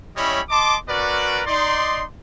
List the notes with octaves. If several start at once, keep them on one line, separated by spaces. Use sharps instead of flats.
G3 C#4 E4 C#5 D#5 B5
D#5 A5 C6 D6
C#4 F#4 A#4 B4 D5
D#4 D5 C6